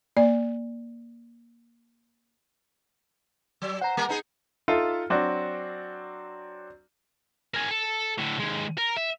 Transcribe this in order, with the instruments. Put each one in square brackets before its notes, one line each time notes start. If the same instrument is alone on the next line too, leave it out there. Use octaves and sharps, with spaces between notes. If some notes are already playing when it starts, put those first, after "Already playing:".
[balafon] A#3 D5
[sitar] F#3
[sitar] C5 [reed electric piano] F#5 A#5
[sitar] G3 A#3 A#4
B3 D#4 G#4
[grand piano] D#4 F4 A4 E5 C6
F#3 C4 D4 F#4
[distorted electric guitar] G#4 A#4
A4
A2 D3
D#2 G#3
A#4
E5